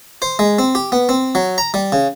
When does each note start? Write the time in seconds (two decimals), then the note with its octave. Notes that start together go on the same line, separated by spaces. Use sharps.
0.22 C5
0.39 G#3
0.59 C4
0.75 G4
0.92 B3
1.09 C4
1.35 F#3
1.58 A#5
1.74 G3
1.92 C#3